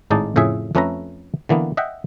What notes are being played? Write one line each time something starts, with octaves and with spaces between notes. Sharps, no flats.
G#1 A2 G#3 D#4 D5 A5
F2 A2 C#3 G#4 E5
F2 A3 C#4 B4 E5 A#5
D3 E3 A#3 B3
D#5 E5 F#5 G5